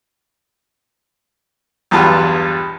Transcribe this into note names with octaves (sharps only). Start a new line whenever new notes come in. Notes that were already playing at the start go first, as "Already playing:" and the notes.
B1 E2 G2 F4 A5